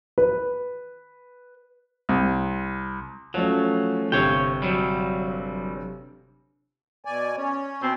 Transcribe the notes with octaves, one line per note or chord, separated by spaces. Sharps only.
B4
C2
F3 F#3 A3 C#4
G1 C3 C#5 G5
F#3 G3
B2 D5 G#5
C#4 C#5
B2 C4